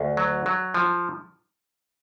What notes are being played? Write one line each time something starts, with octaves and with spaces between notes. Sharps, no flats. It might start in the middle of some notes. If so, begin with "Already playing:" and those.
Already playing: D2
F#3
F#3
F3